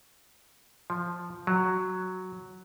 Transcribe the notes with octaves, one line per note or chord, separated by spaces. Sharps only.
F3
F#3